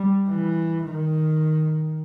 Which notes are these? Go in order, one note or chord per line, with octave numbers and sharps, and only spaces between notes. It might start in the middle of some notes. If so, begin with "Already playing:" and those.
Already playing: G3
E3
D#3